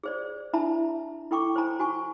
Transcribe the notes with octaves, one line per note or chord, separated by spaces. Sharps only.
G#4 C5 D5
D4 E4 E5 A5 A#5
E4 A4 G5 C#6 D6
C5 G#5 A#5
F#4 G#5 C#6